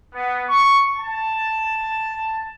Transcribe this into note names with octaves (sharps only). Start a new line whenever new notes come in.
B3
C#6
A5